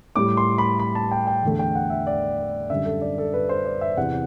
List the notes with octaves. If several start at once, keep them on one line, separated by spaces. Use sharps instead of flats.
A2 G3 D6
C6
B5
B5
A5
G5
G5
E2 D3 A3
G5
F#5
E5
D5
F#2 D3 G3 E5
A4
D5
A4
B4
C5
D5
E5
E2 C3 E3 F#5